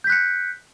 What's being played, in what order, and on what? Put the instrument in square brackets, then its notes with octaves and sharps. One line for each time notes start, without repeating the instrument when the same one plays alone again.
[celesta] G6
B6
F#6
C#7